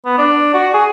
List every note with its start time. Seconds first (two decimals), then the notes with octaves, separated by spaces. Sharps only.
0.06 B3
0.18 D4
0.54 F#4
0.74 G#4